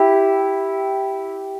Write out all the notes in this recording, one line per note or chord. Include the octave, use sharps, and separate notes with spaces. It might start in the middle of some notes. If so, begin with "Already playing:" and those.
Already playing: E4 G4